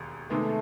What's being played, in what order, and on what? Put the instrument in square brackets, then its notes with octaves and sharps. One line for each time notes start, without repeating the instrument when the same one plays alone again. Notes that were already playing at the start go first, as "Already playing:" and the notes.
Already playing: [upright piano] E1 D#2
[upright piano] C3 D#3 G#3 B3 [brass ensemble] A3